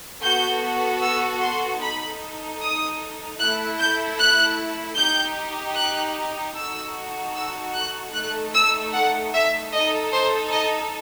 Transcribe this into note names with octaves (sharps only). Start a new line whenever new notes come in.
B3 F#4 A4 G6
E6
C6
D#4 A4 B5
D#6
A3 E4 A4 F#6
G6
F#6
D#4 G4 G6
F#6
D#4 F#4 A4 E6
E6
F#6
A3 D#4 A4 F#6
E6
F#5
E5
D#4 A4 D#5
C5
D#5